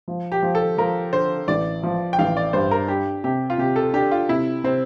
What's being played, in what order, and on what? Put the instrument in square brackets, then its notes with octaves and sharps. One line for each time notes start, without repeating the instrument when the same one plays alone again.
[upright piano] F3
[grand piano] G4
[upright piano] F3
[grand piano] A4
[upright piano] F3 [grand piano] A#4
[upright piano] D3 [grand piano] C5
[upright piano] A1 [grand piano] D5
[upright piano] F3
[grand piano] G5
[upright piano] A1 [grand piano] F5
[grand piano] D5
[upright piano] G2 [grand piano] C5
[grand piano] A#4
[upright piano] D4 [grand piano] G4
[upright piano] C3 [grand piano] G4
[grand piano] F4
[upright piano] C3 [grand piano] G4
[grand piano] A4
[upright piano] D4 [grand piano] G4
[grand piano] F4
[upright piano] C3 [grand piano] E4
[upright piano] C3 [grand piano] C4